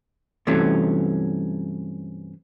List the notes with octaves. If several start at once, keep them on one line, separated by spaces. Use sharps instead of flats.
G2 C3 E3 F#3 A3 C#4